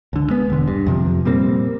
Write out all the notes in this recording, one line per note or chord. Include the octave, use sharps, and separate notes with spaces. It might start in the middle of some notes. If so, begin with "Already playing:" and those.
C#2 D3
G#3 B3
E1 D3
G2
F2 C3 F3
A#2 G3 A#3 C4